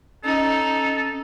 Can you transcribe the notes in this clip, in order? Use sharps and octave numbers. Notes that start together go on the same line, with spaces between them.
C#4 D#4 A4